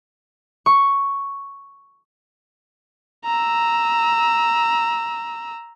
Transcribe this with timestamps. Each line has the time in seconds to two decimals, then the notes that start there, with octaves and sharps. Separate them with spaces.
0.66 C#6
3.25 A#5 E6